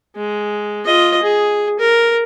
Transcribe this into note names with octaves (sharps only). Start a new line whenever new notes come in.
G#3
F4 D#5
G#4
A#4